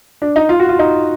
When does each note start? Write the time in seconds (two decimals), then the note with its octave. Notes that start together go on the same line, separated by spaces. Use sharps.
0.22 D4
0.36 D#4
0.49 F4
0.60 F#4
0.69 F4
0.79 D#4